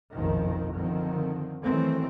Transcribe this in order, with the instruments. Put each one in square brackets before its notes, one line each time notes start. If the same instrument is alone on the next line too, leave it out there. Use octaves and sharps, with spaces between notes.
[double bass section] F#1 B1 F2 A#2 D#3 F3
D3 D#3 F3 C4
D#3 E3 F#3 A3 C4